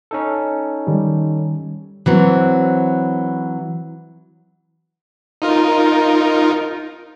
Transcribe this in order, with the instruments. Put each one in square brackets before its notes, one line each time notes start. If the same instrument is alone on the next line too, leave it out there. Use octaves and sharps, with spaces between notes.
[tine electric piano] C#4 D#4 A4
[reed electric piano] D#3 G3
[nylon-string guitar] E3 F#3 C4
[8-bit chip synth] D#4 F4 A#4